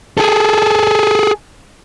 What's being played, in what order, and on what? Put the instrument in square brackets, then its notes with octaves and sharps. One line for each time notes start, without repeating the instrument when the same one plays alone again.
[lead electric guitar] G#4 A4